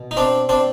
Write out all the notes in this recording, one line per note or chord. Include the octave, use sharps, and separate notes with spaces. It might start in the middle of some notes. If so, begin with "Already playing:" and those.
Already playing: B2
D#4
C4 D4
C4 D4